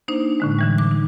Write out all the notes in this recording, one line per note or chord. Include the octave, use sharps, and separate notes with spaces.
A#3 D4 D#4 C5
A2 D3 G#3
D3 E3 G3
D6
D#4